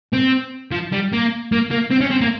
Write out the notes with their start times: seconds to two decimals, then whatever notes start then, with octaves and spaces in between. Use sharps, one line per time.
0.13 C4
0.71 F3
0.92 G3
1.12 A#3
1.52 A#3
1.71 A#3
1.91 C4
2.01 C#4
2.11 C4
2.21 A#3